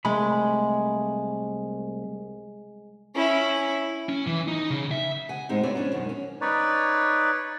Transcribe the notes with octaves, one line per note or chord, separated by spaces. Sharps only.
C2 G#3 A3 B5
C#4 E4
C#4
E3
D#4
C#3
E5
F#5 G#5
A2 G#3 C4 D#4
C4 D4 F#4 B4 C#5 D5
F3 C#4 D4
F#2 B2 D#3
C#4
D#4 B4 C#5 D5